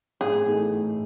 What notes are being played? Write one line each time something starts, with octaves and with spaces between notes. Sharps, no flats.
A2 G#4
E3 A3 D#4 A4
A2